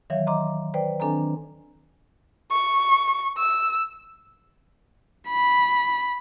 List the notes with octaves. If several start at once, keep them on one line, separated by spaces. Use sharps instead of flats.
D#3 E3 F#3 C#5 E5 F5
D#5 A#5 C6 D6
B4 C5 D5 G5
D#3 C4 D4 A4 G#5 A#5
C#6
E6
B5